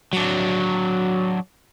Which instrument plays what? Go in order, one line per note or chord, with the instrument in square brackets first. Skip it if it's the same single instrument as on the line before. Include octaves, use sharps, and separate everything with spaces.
[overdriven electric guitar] F#3 D4